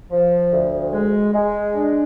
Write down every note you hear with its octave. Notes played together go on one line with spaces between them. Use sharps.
F3
D2
G#3
G#3
D4